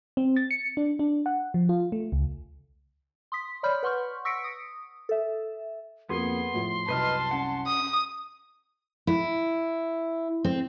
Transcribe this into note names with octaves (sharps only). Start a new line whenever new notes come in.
C4
A6
C#7
D4
D4
F#5
F3
F4
A3
C#2
C6 D#6 B6
C#5 D5 B5 F6 G6
B4 F#5 C6 C#6 F6
C#6 E6 A#6 B6 C#7 D7
D#6
A4 E5
F2 A#3 B3 G#4 C6
A2 F3
C2 F#2 B4 D#5 A5 F6
C#4 F#5
D#6
E4
C4